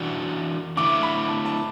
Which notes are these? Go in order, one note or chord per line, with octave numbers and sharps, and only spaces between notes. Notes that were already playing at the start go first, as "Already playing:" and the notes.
Already playing: E3 D4 F#4
D3 A3 E4 D6
B5
A5
A5